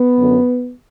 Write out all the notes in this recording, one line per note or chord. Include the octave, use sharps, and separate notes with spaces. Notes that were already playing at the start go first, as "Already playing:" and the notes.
Already playing: B3
F#2 D3